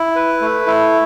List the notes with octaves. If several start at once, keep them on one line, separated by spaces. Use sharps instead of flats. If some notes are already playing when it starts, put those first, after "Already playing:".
Already playing: E4
B4
A3
E4